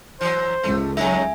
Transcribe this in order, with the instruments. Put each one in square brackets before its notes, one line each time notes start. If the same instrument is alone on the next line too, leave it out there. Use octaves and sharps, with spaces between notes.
[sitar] E3 F#3 [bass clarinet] C5
[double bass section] C#2 [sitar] A3
[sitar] F2 C#3 D#4 [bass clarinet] F#3 [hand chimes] E5 G#5